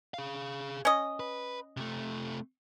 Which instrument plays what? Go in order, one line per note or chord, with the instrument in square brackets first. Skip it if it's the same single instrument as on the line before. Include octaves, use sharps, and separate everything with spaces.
[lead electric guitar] G#4 F5
[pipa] C#4 D#5
[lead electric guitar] B4
C3 A3